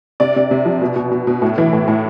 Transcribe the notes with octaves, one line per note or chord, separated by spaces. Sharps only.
C3 D5
C3
C3
F3
B2
B2
B2
B2
A2
E3
A2
A2